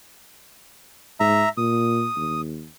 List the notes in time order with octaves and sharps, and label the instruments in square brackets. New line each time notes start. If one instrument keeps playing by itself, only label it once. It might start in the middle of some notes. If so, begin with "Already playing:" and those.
[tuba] G#2 [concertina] E5 A#5
[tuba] A#2 [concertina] D#6
[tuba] D#2